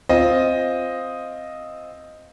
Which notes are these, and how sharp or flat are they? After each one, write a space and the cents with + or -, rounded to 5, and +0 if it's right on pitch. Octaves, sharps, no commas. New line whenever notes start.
C4 +0 F4 +0 D#5 +0